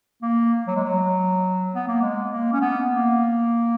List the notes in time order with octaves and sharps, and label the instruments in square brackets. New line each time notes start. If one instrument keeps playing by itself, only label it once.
[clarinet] A#3
F#3
G#3
F#3
B3
A#3
G#3
A#3
C#4
B3
A#3